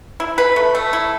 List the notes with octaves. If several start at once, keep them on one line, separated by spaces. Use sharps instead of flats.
E4
B4
A3
A3
E4